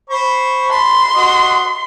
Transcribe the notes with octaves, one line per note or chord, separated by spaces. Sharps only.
C5 B5 C#6
A5 B5 C6
F#4 D#5